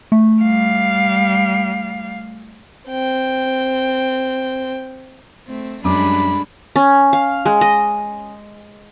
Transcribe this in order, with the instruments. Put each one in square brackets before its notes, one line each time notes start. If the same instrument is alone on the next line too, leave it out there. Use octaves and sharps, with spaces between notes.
[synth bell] A3
[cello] G3 F5
[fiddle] C4 G5
[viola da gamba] A3 C4
[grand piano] F#2 D6 [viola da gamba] G3 G#3 D4 [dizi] B5
[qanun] C#4
F5
G#3
D#5